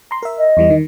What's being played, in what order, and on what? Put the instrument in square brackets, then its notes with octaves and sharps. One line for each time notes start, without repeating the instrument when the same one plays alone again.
[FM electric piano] A#5 C6
A#4 E5
[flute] D#5
[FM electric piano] E2 E3 G3
D#3